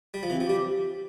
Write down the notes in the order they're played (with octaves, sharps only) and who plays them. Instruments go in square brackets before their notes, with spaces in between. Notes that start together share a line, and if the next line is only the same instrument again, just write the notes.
[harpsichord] G3
F3
[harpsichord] E3 [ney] C4
[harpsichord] F3
[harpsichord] G3 [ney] G4